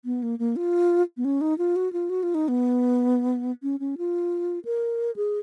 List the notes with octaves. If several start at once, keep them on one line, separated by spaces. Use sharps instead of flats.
B3
A#3
A#3
F4
B3
C#4
D#4
F4
F#4
F4
F#4
F4
D#4
B3
C#4
C#4
F4
A#4
G#4